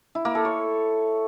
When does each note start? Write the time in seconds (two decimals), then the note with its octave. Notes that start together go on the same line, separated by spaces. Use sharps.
0.15 E4
0.25 A#3
0.35 A4
0.45 C#5